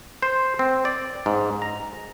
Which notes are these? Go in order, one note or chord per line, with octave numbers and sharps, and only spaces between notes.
C5
C4
D5
G#2
A#5